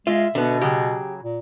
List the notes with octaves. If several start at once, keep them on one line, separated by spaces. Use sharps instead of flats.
G#3 F4 E5
B2 D3 B3
C#3 F#3 G4 G#4
A#2